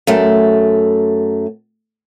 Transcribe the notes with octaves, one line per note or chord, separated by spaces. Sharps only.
F#2 A3